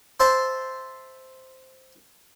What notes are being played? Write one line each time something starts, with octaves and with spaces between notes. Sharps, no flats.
C5 E5 A5 C6